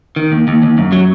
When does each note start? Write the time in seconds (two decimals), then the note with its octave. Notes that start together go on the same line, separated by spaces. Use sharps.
0.16 D#3
0.32 D#2
0.48 D#2
0.62 D#2
0.78 F#2
0.92 F#3